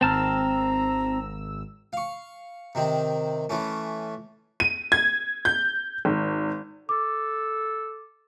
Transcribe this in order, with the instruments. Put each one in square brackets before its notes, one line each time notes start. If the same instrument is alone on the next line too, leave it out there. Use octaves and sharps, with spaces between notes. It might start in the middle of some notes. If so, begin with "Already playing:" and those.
[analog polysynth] G#1 E6 [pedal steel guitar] C4 A5 F6 [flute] A#5
[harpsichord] F5 C#6
C3 D#3 C4
E3 A3 C#4
[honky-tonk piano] D#7
G#6
G6
G#1
[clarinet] A4 [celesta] D6